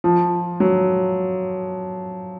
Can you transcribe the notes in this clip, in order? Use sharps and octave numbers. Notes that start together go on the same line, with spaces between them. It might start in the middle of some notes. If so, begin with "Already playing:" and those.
F3
F#3